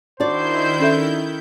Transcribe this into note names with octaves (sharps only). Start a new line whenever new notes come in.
D#3 D4 E4 F#4 C5 D5 G6
C#4 A4 E5